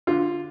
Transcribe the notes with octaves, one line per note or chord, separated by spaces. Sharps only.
D3 F4